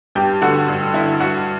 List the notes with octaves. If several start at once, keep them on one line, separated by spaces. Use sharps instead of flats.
G2 G4 G5
D3 F#4 F#5
G2
D3 E4 E5
G2 F#4 F#5